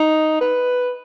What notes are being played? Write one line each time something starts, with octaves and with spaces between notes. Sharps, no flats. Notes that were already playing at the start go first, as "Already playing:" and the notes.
Already playing: D#4
B4